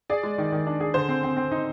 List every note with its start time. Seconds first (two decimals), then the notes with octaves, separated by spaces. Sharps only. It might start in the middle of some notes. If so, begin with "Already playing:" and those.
0.10 G#4 D5
0.23 G#3
0.38 D#3
0.52 D#3
0.67 D4
0.81 G#4
0.94 D3 C5
1.09 C4
1.23 C4
1.37 C4
1.52 D#4